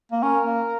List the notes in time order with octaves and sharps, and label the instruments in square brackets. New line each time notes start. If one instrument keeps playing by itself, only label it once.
[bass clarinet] A#3
[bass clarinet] C#4 [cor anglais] A#4
[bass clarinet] A#3